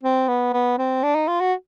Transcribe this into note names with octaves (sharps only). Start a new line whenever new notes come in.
C4
B3
B3
C4
D4
D#4
F4
F#4